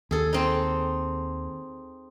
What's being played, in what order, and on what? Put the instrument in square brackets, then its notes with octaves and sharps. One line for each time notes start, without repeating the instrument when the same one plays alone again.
[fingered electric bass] D#2 [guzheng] G#4 A4
[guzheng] C4 D#4